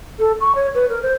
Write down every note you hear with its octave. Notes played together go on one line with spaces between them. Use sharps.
A4
C#6
C#5
B4
A#4
C5